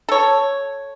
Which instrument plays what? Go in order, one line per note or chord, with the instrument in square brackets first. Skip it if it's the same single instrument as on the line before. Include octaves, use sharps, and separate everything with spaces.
[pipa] A4 C#5